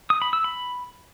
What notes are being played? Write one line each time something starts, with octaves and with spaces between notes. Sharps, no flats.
D#6
B5
E6
B5